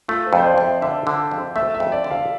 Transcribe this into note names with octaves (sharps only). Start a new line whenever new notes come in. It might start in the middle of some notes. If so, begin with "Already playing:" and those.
A3 F4
C5
F2
C5
D5
F2
E5
D3 E5
D3
F2
A3 E5
E5
F2
D5
D3
F5